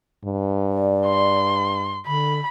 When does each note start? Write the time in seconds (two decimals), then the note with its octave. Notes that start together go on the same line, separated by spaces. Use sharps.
0.25 G2
0.70 D5
1.06 C6
2.06 D3 B5